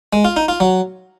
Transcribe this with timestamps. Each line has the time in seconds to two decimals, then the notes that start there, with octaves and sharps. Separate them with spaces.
0.13 G#3
0.25 F4
0.37 D#4
0.48 F4
0.60 F#3